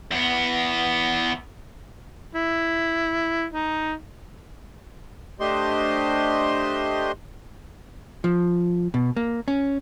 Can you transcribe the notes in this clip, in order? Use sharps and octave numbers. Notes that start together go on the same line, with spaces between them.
E2 B3
E4
D#4
A3 D4 G4 C5 D#5 C6
F3
B2
A#3
C#4